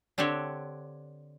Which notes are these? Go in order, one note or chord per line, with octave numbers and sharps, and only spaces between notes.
D3 C4 D4 G4 C#5